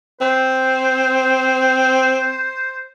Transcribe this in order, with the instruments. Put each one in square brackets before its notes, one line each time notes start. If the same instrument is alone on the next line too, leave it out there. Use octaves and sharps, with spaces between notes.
[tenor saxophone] C4 [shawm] C5